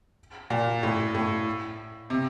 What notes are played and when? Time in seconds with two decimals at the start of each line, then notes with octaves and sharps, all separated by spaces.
0.50 A#2
0.83 A2
1.14 A2
2.10 C3